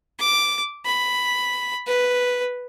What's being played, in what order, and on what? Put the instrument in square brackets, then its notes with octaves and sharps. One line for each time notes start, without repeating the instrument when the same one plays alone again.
[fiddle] D6
B5
B4